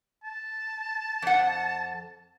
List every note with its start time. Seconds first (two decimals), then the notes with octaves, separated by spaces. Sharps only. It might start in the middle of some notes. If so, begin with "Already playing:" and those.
0.23 A5
1.22 F2 F#5